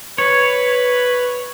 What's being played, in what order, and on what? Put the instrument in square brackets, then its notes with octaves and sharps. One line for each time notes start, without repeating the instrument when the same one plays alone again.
[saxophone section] B4 [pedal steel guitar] C#5